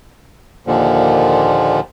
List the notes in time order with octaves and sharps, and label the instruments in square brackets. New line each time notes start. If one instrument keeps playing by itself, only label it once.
[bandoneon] D#2 A#2 D3 F3